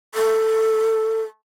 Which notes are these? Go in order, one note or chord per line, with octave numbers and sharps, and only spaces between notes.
A4